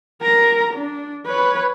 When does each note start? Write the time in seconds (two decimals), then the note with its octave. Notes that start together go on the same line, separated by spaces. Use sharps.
0.22 A#4 A#5
0.73 D4
1.26 B4 C#5